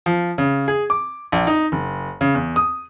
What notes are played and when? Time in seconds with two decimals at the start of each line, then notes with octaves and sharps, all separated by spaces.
0.06 F3
0.38 C#3
0.68 G#4
0.90 D6
1.32 A#1
1.47 D#4
1.72 F#1
2.21 C#3
2.34 E2
2.56 D#6